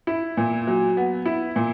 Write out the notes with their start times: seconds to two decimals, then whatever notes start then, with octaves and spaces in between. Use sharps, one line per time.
0.07 E4
0.37 A#2
0.67 F#3
0.97 B3
1.26 E4
1.56 A#2